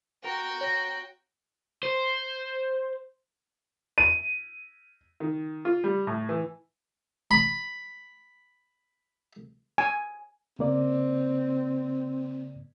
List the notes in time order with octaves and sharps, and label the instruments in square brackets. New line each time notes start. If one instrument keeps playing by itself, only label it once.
[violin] F#4 G5 [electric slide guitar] A#4 A#5
[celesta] C#5 A#6
[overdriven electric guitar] C5
[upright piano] D#7
[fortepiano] D#3
F4
G3
A2
E3
[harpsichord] B5
[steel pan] G#5
[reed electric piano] C#3 A#3 D5 [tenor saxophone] C4